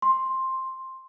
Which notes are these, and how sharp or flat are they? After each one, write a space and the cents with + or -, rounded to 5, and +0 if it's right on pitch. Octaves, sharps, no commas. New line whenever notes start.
C6 +10